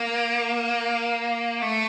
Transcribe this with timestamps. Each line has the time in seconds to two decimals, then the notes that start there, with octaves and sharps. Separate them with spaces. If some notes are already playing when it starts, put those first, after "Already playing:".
Already playing: A#3
1.62 A3